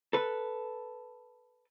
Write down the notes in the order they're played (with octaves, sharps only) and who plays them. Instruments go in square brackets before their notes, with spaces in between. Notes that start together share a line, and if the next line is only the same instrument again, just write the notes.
[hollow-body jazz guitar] A4 B4